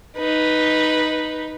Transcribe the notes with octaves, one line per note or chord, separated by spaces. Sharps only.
D#4 B4